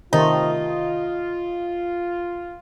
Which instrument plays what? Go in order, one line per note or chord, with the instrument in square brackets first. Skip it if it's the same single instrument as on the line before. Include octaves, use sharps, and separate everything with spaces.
[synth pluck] C3 D#3 A3 [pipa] D#4 [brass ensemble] F4